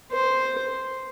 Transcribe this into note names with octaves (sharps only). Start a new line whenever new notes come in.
C5